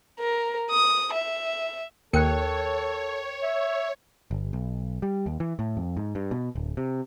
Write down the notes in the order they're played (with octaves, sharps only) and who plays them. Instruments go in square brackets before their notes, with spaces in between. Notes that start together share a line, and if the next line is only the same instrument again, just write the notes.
[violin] A#4
D#6
E5
[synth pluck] D#2 C#7 [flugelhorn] A4 [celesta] A#4 G5 F#6 [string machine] C#5
[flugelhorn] E5
[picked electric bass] G1
B1
G3
D#2
E3
A2
F2
G#2
G2
B2
D1
C3